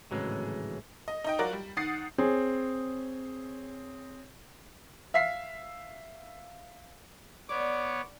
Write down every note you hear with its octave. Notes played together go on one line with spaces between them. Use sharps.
G#1 A2 C#3 E3 F#3 G#3
D#5
D#4 D#5 G5
F#3 F4 F#4 A#4 D5
G3
D#3 F#5 D#6 A6 C7
C4 G#4 C#5
E5 F5 B6 C7
B3 C#5 D5 D6